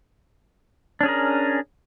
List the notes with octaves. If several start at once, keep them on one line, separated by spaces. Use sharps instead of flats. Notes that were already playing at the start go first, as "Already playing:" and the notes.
C#4 D4 G#4 A#4